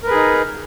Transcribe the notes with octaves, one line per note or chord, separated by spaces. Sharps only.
D#4 G#4 A#4 B4